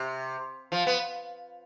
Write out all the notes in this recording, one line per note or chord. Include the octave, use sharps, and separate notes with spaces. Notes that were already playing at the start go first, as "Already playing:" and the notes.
Already playing: C3
F3
B3